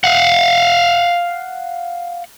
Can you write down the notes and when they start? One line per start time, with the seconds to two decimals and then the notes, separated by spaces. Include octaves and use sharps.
0.04 F5 F#5